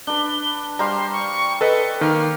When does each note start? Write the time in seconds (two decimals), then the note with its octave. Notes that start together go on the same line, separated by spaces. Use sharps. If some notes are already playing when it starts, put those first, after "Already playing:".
0.07 D4 B4 G7
0.79 G3 C5 F5 A#5 C6
1.12 C#6
1.61 A4 B4 D#5 C#7
2.01 D#3 A#3 F6